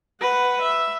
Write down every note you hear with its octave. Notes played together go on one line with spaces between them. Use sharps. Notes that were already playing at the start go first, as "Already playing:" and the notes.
B4 F#5
E5